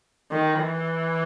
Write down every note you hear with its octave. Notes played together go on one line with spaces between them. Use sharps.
D#3
E3